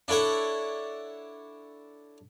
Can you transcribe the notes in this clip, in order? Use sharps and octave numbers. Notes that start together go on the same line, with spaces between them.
D4 E4 A4 C#5 F#5